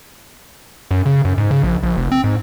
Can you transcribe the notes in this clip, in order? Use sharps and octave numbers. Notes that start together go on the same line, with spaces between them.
F#2
C#3
F#2
G#2
C#3
A#1
A#1
F1
C4
G#2